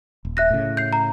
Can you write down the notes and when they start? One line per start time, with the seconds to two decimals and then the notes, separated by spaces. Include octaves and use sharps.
0.25 D#1
0.37 E5 F#6 A#6
0.51 A2 C#3
0.77 G6 C7
0.93 A#5